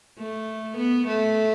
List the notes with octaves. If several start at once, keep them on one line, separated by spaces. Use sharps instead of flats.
A3
B3
A3